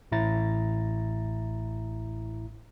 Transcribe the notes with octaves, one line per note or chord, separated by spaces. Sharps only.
A1 A2 E4 A#5 A6